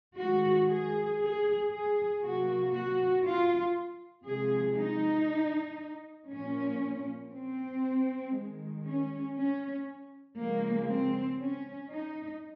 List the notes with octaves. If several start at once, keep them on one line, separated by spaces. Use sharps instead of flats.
D#3 G#3 F#4
G#4
G#4
G#4
C3 F#3 A#3 F#4
F#4
F4
C3 F3 G#3 G#4
D#4
A#2 F3 A#3 C#4
C4
D#3 G#3
C#4
C#4
C#3 F3 G#3 A#3
C4
C#4
D#4